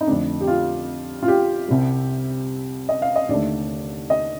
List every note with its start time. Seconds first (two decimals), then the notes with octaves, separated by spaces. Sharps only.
0.01 D#4
0.07 F2 D3 A3 D4
0.41 G4
0.47 F4
1.23 F4
1.28 G4
1.68 C2 C3 G3
2.89 D#5
3.02 F5
3.16 D#5
3.29 D#2 D3 A3 D5
4.10 D#5